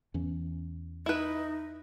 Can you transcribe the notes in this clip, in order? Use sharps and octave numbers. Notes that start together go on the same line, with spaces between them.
E2 E3 C#4
D#4 E4 B4